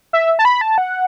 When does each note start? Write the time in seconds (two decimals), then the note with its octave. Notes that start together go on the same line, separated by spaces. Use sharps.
0.13 E5
0.39 A5
0.45 B5
0.61 A5
0.78 F#5